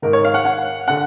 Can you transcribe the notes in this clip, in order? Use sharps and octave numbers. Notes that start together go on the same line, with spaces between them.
G#2 D#3 A#4
C#5
F5
F#5
F#5
D3 F#5